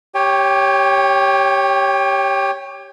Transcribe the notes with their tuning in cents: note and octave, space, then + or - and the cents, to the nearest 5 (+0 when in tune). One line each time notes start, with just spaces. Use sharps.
G4 +0 C#5 +0 G5 +35